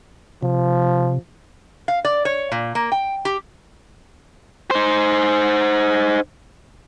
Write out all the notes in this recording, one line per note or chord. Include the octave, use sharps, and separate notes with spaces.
C3 F3
F5
D5
C#5
A#2
A#3
G5
G4
D#4 C5